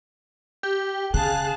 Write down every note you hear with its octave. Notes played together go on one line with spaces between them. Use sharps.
G4
C#3 G#4 F5 A5 F#6